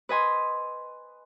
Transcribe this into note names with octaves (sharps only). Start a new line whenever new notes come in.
B4 D#5 G#5 C6